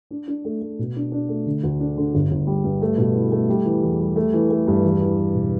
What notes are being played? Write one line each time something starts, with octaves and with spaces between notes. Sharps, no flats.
D4
D4
A3
A3
B2
D4
D4
A3
D3
D2
D4
D3
G1
G1
G3
G2
A3
B2
E4
A3
G3
E3
E2
G3
A3
E3
A3
G2
E2
E3
E3
E1